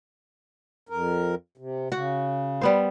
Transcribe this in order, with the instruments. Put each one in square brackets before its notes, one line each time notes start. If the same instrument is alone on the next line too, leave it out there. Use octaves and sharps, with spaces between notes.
[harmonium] F2 A#4
C3
[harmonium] C#3 [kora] F#4
[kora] G3 B3 C5